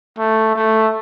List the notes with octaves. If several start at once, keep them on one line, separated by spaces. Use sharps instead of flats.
A3
A3